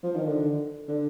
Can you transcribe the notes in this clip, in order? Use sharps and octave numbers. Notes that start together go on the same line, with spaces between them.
F3
D#3
D3
D3